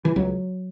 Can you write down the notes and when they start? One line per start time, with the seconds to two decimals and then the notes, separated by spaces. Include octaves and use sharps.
0.05 E3
0.16 C#2 F#3